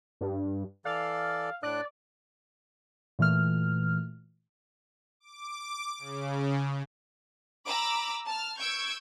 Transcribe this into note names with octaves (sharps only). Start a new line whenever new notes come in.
G2
E3 A4 D5 F5
A2 D4 D5 F#6
A#2 E3 A3 F6
D6
C#3
A#5 B5 D6 E6
A5 F6
C#6 E6 G6 G#6 C#7 D7